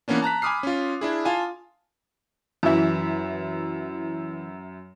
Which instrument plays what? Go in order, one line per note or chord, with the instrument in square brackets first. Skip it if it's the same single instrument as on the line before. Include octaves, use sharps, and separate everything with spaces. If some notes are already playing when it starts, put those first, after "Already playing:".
[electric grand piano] E3 A#3 B3 C#4 D4
A5 A#5 F#6 B6
G#5 B5 D6 D#6 F6 C7
C#4 F4
D4 E4 G#4
F4 F5 G#5 A5
[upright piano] F#2 E5 [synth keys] E3 E4